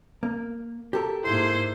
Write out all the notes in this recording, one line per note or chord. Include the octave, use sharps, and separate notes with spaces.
A#3
G4 A4 A#4
G#2 A#3 E4 C5 C6